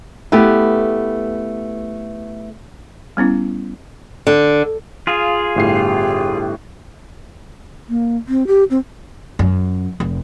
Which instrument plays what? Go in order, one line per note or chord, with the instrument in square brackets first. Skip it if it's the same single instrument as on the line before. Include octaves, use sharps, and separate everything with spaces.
[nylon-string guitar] A3 B3 E4 G4
[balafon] G3 B3 C#4 E4
[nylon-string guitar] D3
[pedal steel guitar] F4 G#4 [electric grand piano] F5
[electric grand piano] G1 A2 C7 [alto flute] G4
[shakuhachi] A#3
C4
G4
C4
[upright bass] F#2
F1